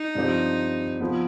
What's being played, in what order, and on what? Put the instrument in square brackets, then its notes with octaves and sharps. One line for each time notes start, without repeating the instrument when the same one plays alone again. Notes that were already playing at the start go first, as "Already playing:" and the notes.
Already playing: [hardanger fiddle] D#4
[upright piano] G2 F3 C4 G4
F3 B3